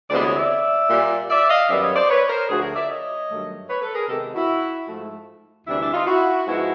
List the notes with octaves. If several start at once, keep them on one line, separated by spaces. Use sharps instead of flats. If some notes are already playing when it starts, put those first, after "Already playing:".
D2 C3 E3 G#3 B3 C5 D5
C#5 D#5
D5 E5
A#2 G3 A#3
D5 E5
D#5 F5
F#2 D#3 G3 B3 D5 E5
C#5 D#5
C5 D5
B4 C#5
A#4 C5
D2 D3 F3 A3 F#4 G#4
G#4 A#4
D5 E5
C#5 D#5
G2 D#3 F#3 A3
B4 C#5
A4 B4
G#4 A#4
C3 D#3 G#3 B3 G4 A4
E4 F#4
G#2 F3 A3
D2 C3 E3 G3 D4 E4
D4 E4
D#4 F4
E4 F#4
G#2 F3 G#3 B3 E4 F#4